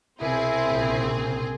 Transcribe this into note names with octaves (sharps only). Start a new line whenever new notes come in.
C2 B2 C4 E4 G#4
A#1 C#3